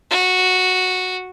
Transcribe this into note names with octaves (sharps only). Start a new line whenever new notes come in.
F#4